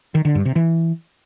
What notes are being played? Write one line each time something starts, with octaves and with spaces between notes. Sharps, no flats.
D#3
D3
G2
C3
E3